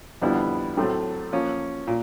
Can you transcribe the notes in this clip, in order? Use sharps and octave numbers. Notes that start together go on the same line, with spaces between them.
F2 D3 G3 B3 E4
A2 F#3 A3 C4
F3 A#3 C#4
A#2